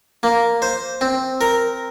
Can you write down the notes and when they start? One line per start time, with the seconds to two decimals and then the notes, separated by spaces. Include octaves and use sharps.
0.23 A#3
0.62 C5
1.01 C4
1.41 A#4